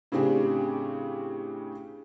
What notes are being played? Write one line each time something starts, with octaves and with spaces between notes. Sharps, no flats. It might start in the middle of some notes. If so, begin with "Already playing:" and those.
A2 C#3 C4 D4 G4 G#4